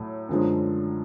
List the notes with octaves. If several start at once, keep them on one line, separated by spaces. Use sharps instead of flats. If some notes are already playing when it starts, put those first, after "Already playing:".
Already playing: A2 F#3 A3
F#2 D3 F3 G#3